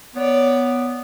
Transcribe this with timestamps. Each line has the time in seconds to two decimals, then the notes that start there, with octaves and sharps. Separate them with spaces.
0.15 B3 C#5 D5